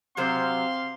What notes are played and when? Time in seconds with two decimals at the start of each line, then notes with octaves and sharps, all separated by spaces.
0.17 C3 F#3 C4 C5 F5 C6